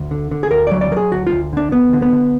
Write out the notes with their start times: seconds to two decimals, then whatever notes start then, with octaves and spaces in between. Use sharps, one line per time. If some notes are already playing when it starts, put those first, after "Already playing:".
Already playing: D2
0.11 D3
0.31 D3
0.43 G#4
0.51 D2 A#4
0.67 F#3 D5
0.81 D5
0.92 F#3 A#4
0.97 G#4
1.12 D2 F#4
1.27 F4
1.32 D2
1.53 D3 D4
1.72 D2 B3
1.93 D3
2.02 B3
2.12 D3